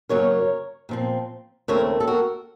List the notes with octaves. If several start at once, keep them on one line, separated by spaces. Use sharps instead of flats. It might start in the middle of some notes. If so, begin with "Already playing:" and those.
F#2 C#3 F#3 A#3 A#4 C#5
A#2 F3 C4
D#2 C#3 A3 C4 A#4 C#5
A4
F#4 A#4